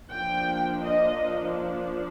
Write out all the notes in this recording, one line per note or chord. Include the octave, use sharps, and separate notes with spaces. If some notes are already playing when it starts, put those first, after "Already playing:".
F3 A#3 D4 G5
D#5